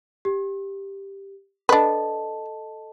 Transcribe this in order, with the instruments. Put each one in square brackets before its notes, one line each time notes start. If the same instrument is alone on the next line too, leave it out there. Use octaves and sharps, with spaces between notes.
[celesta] G4
[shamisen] D4 B4 [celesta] A4 D#5 A5